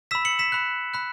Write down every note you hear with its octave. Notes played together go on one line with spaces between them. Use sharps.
B5 E6 B6 E7
C#7 F#7
B6 E7
B5 F#6
B5 F#6